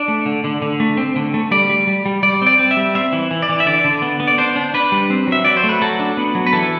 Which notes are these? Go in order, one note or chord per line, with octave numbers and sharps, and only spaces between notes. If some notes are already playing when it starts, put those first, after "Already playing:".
Already playing: D4 D5
A3
D3
D3
D3
A3
C4
D3
A3
G3 D5
G3
G3
G3
G3 D5
C4 D5
C4
E5
G3
C4 E5
E3
E3
D5
E3
E5
D3 D5
D3
B3
B3
D5
D4 C5
D4
D4 B4
G3
C4
F#3 E5
F#3 D5
C5
A3
B4
F#3 A4
D4
B3
F#3
B4
E3 A4